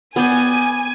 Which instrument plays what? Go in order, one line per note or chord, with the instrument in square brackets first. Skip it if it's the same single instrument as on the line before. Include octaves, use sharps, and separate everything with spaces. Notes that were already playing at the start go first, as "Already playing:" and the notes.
[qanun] B3 D5 G5 [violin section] G#5